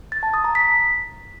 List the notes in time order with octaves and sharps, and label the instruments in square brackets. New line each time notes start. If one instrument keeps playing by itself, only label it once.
[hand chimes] A6
A5
D#6
A#5
B6